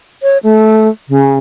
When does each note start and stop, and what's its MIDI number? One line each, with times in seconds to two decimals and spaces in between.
0.23 0.38 73
0.44 0.89 57
1.09 1.38 49